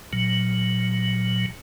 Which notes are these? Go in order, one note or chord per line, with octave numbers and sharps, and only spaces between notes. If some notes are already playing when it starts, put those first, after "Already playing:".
A#2 F#3